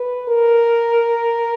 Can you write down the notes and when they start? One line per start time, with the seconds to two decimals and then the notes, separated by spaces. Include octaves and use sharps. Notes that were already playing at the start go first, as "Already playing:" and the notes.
Already playing: B4
0.28 A#4